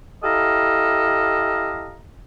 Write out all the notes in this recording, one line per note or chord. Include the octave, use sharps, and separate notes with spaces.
E4 G4 A4 D#5 F5 A#5